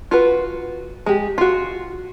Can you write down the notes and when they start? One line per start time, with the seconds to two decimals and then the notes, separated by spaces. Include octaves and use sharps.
0.11 F4 F#4 B4
1.06 G#3 G4
1.38 F4 F#4